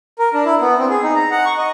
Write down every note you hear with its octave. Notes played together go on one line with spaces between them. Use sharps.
A#4
D4
E4
B3
C4
G#4
D#4
A#5
F#5
C#6
D#5